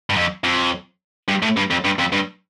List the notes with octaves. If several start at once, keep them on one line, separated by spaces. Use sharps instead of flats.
G2
F2
F2
G2
A2
G2
F2
G2
F2
G2